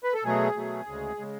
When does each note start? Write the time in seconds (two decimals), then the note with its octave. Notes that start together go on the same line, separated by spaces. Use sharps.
0.04 B4
0.14 A4
0.24 B2 F#3 A3 G#4
0.56 B2 F#3 A3
0.86 D2 C#3 G#3
1.19 C#3 G#3